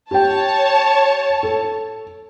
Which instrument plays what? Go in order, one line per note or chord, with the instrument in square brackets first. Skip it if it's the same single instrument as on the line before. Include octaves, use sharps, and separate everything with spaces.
[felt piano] G4 G5 [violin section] C#5 A5
[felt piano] A4